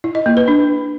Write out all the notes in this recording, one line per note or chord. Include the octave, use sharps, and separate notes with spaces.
E4
D#5
A#3
B4
D4